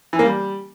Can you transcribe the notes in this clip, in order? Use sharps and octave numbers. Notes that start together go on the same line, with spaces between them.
E3
A#3
G3